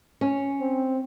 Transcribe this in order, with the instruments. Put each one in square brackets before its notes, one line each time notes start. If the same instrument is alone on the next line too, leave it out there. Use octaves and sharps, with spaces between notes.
[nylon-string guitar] C#4
[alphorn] C4